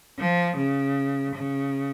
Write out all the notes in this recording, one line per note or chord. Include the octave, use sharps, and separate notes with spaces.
F3
C#3
C#3